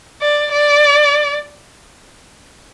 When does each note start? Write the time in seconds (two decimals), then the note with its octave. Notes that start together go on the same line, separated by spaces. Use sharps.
0.22 D5
0.52 D5